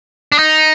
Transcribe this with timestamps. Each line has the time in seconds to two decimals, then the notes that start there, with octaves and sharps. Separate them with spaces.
0.32 D4
0.39 D#4